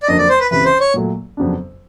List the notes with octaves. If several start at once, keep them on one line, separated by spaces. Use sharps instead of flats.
D5
F2 D3 F#3 A#3 D4 D#5
D5
C5
B4
C#2 C3 E3 B4
C5
C#5
A#2 F#3 A3
F2 C#3 F#3 B3 D4